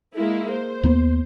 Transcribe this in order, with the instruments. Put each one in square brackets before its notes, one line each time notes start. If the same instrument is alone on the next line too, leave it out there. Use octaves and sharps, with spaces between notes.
[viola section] G#3 A#3 E4
C5
[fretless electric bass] D#2 A#3 B3